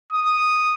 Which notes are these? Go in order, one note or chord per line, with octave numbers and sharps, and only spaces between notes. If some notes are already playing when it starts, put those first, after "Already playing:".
D#6